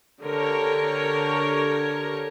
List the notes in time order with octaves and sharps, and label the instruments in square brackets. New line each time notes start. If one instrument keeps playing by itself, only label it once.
[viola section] D3 G4 A#4 C#5